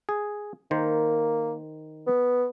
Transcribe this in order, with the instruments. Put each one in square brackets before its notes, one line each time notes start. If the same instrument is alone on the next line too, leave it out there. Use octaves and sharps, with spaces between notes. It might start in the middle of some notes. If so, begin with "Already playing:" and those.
[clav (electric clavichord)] G#4
[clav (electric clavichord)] D#3 C5 [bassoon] A#3
[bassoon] B3